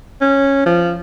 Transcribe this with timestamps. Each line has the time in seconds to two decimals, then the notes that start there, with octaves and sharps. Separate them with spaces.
0.21 C#4
0.66 F3